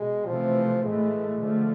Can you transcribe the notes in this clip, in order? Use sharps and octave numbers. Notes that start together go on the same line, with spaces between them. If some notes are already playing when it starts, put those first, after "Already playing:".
Already playing: B2 G#3
C3 E3 F3 A3 C4
A2 E3 G#3 A3
D3 F3 A3